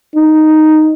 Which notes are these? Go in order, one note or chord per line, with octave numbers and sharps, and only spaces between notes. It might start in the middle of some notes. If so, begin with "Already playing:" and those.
D#4